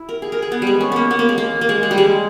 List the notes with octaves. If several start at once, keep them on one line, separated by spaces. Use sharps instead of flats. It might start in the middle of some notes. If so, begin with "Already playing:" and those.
Already playing: E4
A#4
G#4
A#4
G#4
B3
G3 G#3
C#4
A#3 B3
B3
A#3
G#3
A#3
A#3
G#3
G#3
G3
G#3